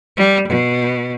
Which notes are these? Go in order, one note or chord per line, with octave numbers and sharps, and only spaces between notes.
G3
B2